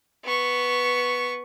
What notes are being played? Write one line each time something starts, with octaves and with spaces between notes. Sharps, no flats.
B3 C#6